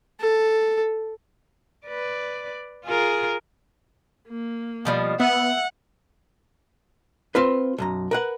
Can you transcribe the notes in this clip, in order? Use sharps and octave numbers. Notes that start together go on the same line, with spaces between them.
A4
B4 D5
F4 G#4 A#4
A#3
B2 F3 G3
B3 E5 F#5
C4 F4 B4
B1 F#2 A#5
A#4 B4 F#5